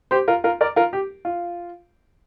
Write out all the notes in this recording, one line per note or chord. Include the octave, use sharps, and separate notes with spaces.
G4 C5
F4 A#4
F4 A#4
A#4 D5
F4 A#4
G4
F4